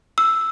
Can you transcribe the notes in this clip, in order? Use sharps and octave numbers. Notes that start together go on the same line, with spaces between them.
E6